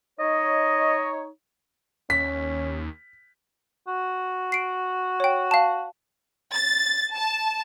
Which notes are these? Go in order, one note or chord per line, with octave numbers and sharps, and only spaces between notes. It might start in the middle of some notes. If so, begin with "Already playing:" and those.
D#4 C#5 D#5
D#2 C#4 B6
F#4
C7 D7
C#5 G5
F5 A5
A6
A5